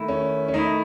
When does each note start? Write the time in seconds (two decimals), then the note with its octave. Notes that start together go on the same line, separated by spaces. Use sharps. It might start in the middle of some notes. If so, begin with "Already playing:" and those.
Already playing: D#3 A3 E4
0.08 C#4
0.48 C#4
0.53 D#3 A3 D#4 E4